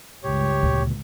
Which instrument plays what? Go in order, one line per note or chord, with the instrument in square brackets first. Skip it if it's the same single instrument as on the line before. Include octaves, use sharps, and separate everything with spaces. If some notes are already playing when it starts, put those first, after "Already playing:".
[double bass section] C#2 G2 [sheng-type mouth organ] G4 C#5
[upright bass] D2 A#2